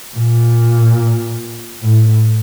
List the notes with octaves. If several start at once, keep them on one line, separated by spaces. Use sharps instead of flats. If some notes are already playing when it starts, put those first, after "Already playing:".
A#2
A2